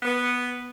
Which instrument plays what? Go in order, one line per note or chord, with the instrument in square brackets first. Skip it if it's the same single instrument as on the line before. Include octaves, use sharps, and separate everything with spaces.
[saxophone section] B3